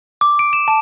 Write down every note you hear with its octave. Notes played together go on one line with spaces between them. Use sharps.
D6
D7
E7
A5